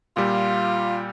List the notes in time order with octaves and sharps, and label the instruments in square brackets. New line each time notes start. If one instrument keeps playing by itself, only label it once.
[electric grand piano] A#2 G3 [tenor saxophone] F4